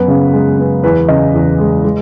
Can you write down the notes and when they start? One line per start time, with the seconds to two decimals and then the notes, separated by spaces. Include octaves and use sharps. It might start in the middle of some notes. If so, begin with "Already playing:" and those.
Already playing: F#2 B3 B4
0.08 C#3
0.33 G#3
0.59 B3
0.84 E2 B4
1.08 C#3 D#5
1.34 E2
1.59 G#3
1.85 G#3